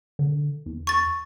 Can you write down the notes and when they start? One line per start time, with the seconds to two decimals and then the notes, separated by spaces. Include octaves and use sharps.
0.19 D3
0.66 E2
0.87 C#6 A6